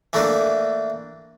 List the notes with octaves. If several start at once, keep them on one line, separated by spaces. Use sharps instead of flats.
E3 A3 A#3 D4